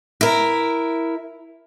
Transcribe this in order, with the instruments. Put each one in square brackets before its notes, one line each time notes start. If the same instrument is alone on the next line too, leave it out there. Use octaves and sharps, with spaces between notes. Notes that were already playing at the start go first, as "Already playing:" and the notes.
[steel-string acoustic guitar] E4 A#4